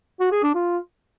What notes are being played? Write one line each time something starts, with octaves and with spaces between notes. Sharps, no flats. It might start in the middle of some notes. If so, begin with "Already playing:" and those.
F#4
G#4
D4
F4